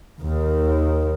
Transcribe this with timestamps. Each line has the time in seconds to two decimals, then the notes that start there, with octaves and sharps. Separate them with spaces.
0.21 D#2 D#3